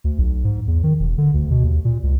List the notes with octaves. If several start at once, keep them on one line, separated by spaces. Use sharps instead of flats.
D2
B1
G#2
E2
D#3
E1
D3
D2
B2
D#2
A#2
C#2